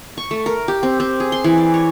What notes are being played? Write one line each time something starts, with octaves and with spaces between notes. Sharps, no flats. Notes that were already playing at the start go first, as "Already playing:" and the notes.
C#6
A3
A#4
G4
C4
C4
G#4
C6
E3
D5
C#5